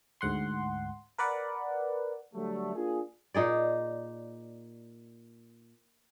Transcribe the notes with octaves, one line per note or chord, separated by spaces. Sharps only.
D2 G#2 F#5 C6
A#4 B4 D5 F#5
D3 F#3 G3 A3
A#3 D4 F4 G#4
A#2 D#4 G#4 D5